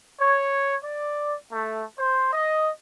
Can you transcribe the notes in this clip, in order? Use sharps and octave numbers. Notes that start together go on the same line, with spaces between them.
C#5
D5
A3
C5
D#5